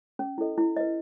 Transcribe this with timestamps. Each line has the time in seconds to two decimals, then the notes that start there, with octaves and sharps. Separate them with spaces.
0.19 C#4
0.38 E4 A4 D#5
0.58 E4
0.77 B4 D#5